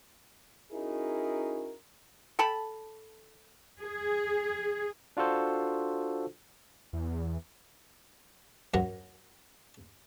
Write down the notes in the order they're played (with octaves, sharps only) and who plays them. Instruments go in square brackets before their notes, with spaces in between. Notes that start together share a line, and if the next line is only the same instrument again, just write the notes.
[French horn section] C#4 D#4 E4 F#4 G#4 A#4
[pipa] A4 G5 A5 B5
[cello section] G#4
[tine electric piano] D4 F4 F#4 A4 C5
[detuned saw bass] E2
[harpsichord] F#2 F#3 A#4 F#5 A#5